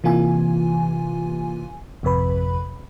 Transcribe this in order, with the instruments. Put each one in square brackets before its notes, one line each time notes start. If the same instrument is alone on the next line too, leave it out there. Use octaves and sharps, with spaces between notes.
[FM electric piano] C3 E3 A#3 F4 G#5
G#1 F2 C3 B4 B5